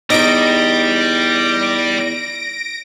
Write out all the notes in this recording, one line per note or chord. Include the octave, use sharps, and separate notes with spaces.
E2 G3 D#4 A#6 D7